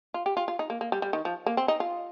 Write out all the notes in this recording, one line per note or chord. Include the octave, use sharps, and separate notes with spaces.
F4
G4
F4
F4
D#4
A#3
A#3
G3
G3
D#3
F3
A#3
C4
D#4
F4